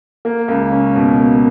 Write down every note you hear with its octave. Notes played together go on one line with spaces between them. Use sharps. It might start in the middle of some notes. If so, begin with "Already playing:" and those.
A#3
C#2
C#4
B2
A#3